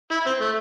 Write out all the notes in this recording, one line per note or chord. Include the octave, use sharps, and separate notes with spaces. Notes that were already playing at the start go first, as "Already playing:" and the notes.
E4
C4
A3